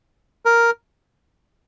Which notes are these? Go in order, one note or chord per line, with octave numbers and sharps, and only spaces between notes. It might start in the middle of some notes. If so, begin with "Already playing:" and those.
A#4